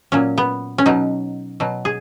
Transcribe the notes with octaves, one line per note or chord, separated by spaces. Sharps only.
A#2 F#3 C#4
B3
C#4
B2 F#3 D#4
B2 F#3
G#4